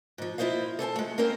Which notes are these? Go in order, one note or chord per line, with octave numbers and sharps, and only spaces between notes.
G#2 F3
E4 F4 C5 D#5 F5
A4 C5 G#5 A5
G#3 A3
A#3 C4 C#4 A#4 C5